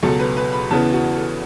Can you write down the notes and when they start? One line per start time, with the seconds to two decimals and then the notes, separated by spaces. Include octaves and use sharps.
0.03 C#2 B2 F#3 A4
0.20 B4
0.37 B4
0.53 B5
0.70 E2 C#3 E3 B3 A5
0.93 F#4
1.15 A4